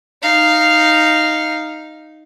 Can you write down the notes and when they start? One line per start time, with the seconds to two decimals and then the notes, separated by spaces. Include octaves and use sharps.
0.23 D#4 F5